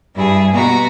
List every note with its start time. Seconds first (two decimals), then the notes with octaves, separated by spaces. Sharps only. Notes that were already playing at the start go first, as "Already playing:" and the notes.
0.14 G2 E4 G#4
0.52 B2 F#4 A#5